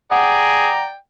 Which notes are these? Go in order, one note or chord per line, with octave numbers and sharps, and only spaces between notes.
G#4 D5 F#5 G5 A#5